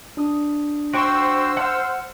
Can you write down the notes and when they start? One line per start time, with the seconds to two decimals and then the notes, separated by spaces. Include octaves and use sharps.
0.17 D4 D#6
0.94 F#4 C5 G5 C#6 E6
1.57 F#5 F6